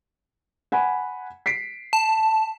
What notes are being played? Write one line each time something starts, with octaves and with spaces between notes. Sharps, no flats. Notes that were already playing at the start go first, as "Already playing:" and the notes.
F#5 G#5 B5
B6 C7 D7
A5